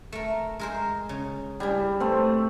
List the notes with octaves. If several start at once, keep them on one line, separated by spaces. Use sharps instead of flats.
A3 A#4
G#3 A#4 C5
C#3
G3 D4 G#4
A3 C4